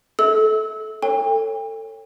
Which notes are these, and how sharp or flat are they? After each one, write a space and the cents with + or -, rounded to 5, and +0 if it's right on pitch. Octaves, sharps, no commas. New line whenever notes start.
A4 -20 E5 -35 E6 -25
A4 +20 C#5 -15 G5 +40